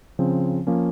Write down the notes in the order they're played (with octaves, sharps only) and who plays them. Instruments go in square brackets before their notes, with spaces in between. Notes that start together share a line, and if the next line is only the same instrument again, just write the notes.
[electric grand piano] C#3 F3 C4
F3 A#3 C#4